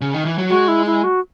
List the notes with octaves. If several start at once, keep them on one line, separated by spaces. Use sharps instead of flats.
C#3
D#3
E3
F#3
G#3 F#4
E4
E4
F#4